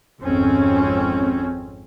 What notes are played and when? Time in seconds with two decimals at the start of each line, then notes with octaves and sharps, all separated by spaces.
0.22 G#1 F2 C4 C#4